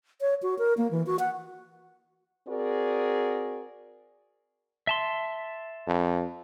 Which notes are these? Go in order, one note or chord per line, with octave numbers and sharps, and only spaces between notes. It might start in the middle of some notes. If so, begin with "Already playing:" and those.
C#5
F#4
A#4
A#3
E3
F#4
F#5
C4 F#4 G#4 A#4 D5
E5 A5 C6
F2